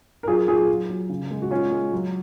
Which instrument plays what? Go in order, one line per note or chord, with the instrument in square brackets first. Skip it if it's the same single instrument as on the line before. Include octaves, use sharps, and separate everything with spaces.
[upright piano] A#4
F#3 F4 G#4
F#3 F4 G#4
F#3
F#3
C#3
G#3
F#4
G#3 C#4 F4
G#3
F#3